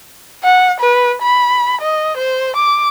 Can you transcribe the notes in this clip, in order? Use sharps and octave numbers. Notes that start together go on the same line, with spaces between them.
F#5
B4
B5
D#5
C5
D6